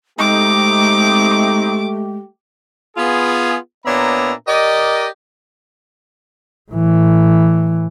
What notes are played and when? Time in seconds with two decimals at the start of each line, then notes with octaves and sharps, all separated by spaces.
0.19 G#3 A3 C4 D#4 G4 D6
2.97 B3 F4 G#4
3.85 A#2 B3 D4 C#5 E5 A#5
4.47 G4 A#4 D5 D#5
6.72 A2 E3